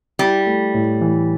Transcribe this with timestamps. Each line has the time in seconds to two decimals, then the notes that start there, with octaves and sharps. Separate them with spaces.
0.19 G3 E4
0.46 A3
0.74 A2
1.01 E3